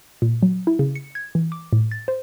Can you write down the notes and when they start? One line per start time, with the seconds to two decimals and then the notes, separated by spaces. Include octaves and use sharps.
0.22 A#2
0.43 F#3
0.67 E4
0.79 C#3
0.95 C#7
1.15 G#6
1.35 E3
1.52 D6
1.73 A2
1.91 A6
2.08 C5